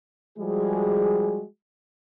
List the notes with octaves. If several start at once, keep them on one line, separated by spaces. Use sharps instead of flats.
F3 G3 G#3 F#4 G#4